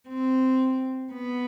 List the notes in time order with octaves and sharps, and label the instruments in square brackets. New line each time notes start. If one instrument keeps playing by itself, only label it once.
[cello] C4
B3